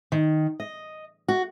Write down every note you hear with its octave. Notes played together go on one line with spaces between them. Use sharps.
D#3
D#5
F#4